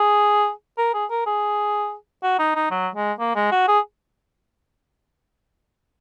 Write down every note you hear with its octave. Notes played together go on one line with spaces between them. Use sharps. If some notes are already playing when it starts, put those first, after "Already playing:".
Already playing: G#4
A#4
G#4
A#4
G#4
F#4
D#4
D#4
F#3
G#3
A#3
G#3
F#4
G#4